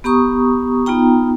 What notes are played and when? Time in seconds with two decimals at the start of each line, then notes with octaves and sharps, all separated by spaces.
0.04 B3 G4 A#5 C#6 D#6
0.86 B3 D#4 F4 G5 A#5